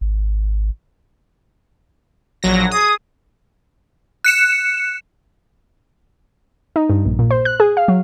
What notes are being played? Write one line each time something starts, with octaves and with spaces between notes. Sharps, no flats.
G#1
A#1 F#3 A#6
G#4 D#6
F#6 C#7 E7
D#4
G2
A#1
A#2
C5
F#6
G#4
F5
F#3